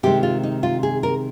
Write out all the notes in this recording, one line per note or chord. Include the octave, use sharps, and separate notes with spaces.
C3 D#3 G#3 G4
F4
D#4
F4
G#4
A#4